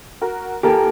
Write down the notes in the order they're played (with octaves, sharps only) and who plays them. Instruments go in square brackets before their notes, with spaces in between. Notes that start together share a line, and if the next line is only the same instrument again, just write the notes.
[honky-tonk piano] F#4 A#4
[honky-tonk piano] D#2 A#4 [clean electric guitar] G4 A4